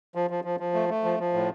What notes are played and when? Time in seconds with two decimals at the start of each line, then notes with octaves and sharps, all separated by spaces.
0.15 F3
0.30 F3
0.44 F3
0.60 F3
0.74 A3
0.89 A3
1.04 F3
1.19 F3
1.34 A2